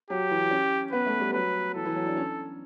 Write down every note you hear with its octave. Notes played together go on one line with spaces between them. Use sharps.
F#3 G4
E3
C#4
B3 B4
A3
G3
F#3 B4
E3 A4
E3
F#3
D4
C#4